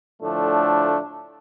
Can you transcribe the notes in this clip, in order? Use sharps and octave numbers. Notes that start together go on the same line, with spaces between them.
A2 D3 F3 A3 D4